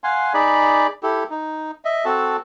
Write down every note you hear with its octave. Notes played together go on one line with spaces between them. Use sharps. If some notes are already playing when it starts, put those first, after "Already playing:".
F5 F#5 G#5 C6
D#4 G#4 D5 B5
E4 G4 A4
D#4
D#5 E5
C4 F#4 A4 A5